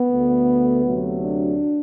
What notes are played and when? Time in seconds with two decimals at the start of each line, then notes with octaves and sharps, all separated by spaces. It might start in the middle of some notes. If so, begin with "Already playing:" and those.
Already playing: B3
0.10 D2 D3 A3
0.85 D2 C3 F#3 A3
1.22 D4